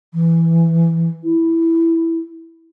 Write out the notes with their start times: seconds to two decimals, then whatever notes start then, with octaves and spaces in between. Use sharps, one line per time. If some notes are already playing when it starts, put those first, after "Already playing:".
0.14 E3
1.24 E4